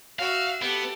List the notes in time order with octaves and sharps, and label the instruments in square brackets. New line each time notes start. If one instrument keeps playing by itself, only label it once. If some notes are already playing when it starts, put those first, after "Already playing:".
[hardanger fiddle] F#4 E5 [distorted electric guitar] F5
[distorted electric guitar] B3 [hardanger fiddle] G4 A4